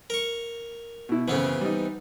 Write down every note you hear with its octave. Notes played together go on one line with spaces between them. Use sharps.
A#4 C#6
B2 E4
F#2 C#3 E3 B3 C4
G3 D#4